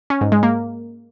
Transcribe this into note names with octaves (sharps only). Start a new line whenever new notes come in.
C#4
G#2
G#3
A#3